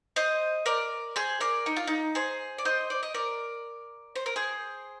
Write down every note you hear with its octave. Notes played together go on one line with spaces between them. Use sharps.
C5 D#5
A#4 D5
G#4 C5
A#4 D5
D#4
F4
D#4
G#4 C5
D5
C5 D#5
D5
D#5
A#4 D5
C5
A#4
G#4 C5